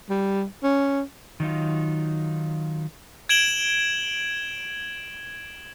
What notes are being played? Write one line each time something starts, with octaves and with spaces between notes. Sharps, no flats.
G3
C#4
D#3 F#3 D#4 F4
G#6 D7 E7 F#7 G7